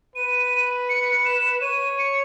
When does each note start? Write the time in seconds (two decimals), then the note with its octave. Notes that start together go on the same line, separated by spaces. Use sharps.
0.16 B4 D#7
0.89 C#7
1.26 E7
1.62 C#5 D#7
1.99 C#7